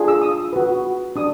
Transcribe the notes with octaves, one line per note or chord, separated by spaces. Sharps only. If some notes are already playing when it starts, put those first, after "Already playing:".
Already playing: D4 F4 G#4
E6
D#6
F#4 B4
D4 G4 D#6